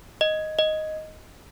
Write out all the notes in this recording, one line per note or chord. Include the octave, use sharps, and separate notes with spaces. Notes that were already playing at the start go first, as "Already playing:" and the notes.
D#5
D#5